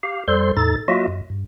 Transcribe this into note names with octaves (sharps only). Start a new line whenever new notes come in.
G4 F5
F2 G3 A4 C5 C6
E2 A2 D#4 A4 A6
F#3 A#3 F4 F#4 D#5 E5
F#2
G2